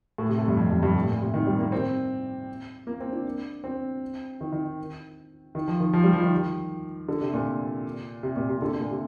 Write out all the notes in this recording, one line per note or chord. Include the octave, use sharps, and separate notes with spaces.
A2
C3
A2
G2
F2
G2
G2
A2
A#2
C3
D#3
G3
A#3
C4
A#3
C4
D4
C4
D#3
D#3
D#3
F3
D#3
F3
G3
F3
D#3
D3
C3
A#2
C3
A#2
C3
D3
A#2
C3